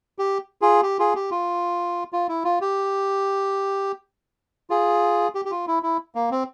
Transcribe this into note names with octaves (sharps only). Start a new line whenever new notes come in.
G4
F4 G#4
G4
F4 G#4
G4
F4
F4
E4
F4
G4
F4 G#4
G4
G4
F4
E4
E4
A#3
C4